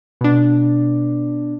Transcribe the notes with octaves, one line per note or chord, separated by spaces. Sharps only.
B2 D4